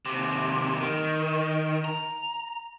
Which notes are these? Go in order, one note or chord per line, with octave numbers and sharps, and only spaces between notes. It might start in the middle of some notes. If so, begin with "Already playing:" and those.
D#2 C3
D#3
A#5